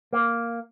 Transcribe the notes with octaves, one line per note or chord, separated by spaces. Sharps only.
A#3